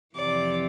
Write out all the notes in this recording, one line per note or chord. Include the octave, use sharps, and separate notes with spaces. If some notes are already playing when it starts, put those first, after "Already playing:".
F2 C3 E3 D5